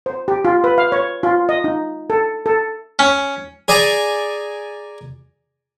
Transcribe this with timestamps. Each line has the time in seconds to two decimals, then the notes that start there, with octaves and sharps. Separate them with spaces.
0.06 C5
0.28 G4
0.45 F4
0.64 B4
0.78 F5
0.92 C#5
1.23 F4
1.49 D#5
1.64 D#4
2.10 A4
2.46 A4
2.99 C#4
3.68 G#4 D5 G#5 A#5